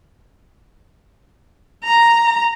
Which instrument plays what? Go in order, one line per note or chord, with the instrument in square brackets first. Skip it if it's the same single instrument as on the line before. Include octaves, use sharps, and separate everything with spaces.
[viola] A#5